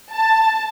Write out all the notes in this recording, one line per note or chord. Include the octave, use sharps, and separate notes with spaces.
A5